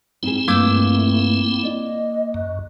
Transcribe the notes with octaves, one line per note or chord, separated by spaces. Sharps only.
G#2 C4 E4 G#4
G2 A3 A#3 D6 G#6
D5 D#5
F#2